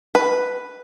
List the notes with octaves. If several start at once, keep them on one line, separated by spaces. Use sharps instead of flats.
B4